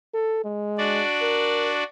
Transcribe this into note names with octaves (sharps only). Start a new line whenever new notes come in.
A4
G#3
D4 F#4 D5
A#4